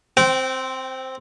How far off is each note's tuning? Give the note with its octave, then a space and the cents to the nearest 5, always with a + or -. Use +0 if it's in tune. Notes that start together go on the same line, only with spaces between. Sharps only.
C4 +0 G5 -30